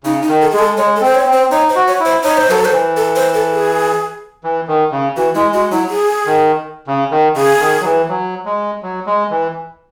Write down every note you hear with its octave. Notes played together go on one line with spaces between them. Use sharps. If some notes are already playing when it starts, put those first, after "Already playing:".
C#3 D#4
D#4
D#3
A4
G#3 G#4
A4
G#3 C#5
A4
C4 C5
C#5
C4
C5
D#4 C#5
C5
F#4
C#5
E4
C5
D#4 C#5
C5
F#3 A4
C5
E3
A4
C5
A4
G#4
E3
D#3
C#3
E3 F#4
G#3 E4
G#3 F#4
F#3 E4
G#4
D#3
C#3
D#3
C#3 G#4
D#3
F#3
E3
F#3
G#3
F#3
G#3
E3